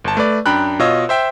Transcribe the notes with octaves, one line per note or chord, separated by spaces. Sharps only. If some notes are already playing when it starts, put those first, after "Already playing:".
G1 A5
A3 B4 D5
F#2 D4 G5 A#5 B5 F#6
B2 F4 C#5 D#5 E6
C5 E5 G5